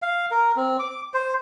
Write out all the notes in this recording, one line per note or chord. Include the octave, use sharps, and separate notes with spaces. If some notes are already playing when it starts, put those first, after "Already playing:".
F5
A#4
C4
D6
C5